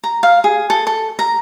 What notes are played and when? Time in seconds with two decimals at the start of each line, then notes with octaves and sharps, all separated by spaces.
0.04 A#5
0.23 F5
0.44 G#4
0.70 A4
0.87 A4
1.19 A#5